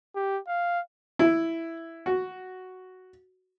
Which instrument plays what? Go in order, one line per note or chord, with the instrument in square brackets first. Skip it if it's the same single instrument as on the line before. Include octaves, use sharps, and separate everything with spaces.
[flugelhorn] G4
F5
[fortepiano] E4
F#4